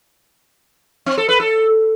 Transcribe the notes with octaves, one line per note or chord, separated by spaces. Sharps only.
C4
A4
B4
A4